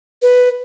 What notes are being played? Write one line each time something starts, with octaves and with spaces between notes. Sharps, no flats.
B4